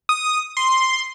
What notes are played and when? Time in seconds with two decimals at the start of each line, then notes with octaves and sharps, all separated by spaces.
0.09 D#6
0.57 C6